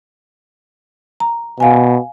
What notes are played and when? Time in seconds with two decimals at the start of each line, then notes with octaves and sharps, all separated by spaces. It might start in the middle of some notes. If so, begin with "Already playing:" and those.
1.20 A#5
1.60 B2 F5 G#5